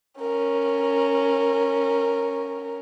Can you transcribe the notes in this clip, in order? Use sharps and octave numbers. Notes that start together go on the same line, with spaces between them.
C#4 A#4